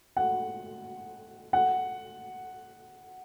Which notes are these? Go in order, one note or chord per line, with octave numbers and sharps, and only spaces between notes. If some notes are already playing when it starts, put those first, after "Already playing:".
F#5
F#5